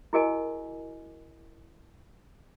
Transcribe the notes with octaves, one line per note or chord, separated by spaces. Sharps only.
E4 F#4 G#4 A#4 D#5 G#5